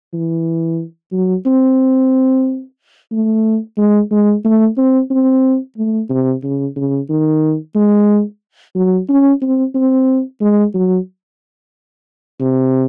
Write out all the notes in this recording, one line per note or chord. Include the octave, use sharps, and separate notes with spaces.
E3
F#3
C4
A3
G#3
G#3
A3
C4
C4
A3
C3
C#3
C#3
D#3
G#3
F#3
C#4
C4
C4
G#3
F#3
C3